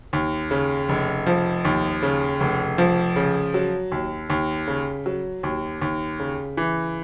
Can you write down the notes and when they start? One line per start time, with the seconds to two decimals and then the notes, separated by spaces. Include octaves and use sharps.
0.13 D#2
0.51 C#3
0.89 F1
1.26 F3
1.65 D#2
2.02 C#3
2.40 F1
2.78 F3
3.16 C#3
3.54 F#3
3.92 D#2
4.30 D#2
4.67 C#3
5.06 F#3
5.43 D#2
5.81 D#2
6.20 C#3
6.57 E3